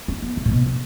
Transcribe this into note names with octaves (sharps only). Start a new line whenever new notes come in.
C#4
B3
C#3
A2
B2
B2